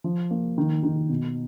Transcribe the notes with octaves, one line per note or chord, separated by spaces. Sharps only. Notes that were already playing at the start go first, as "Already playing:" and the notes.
F3
A#3
D#3
D#3
B2